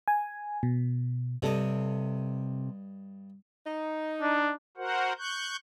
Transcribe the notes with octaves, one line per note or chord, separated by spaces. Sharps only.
G#5
B2
G2 C3 A4 D#5
D#4
D4
F#4 A#4 C5 F#5
C#6 F#6 G6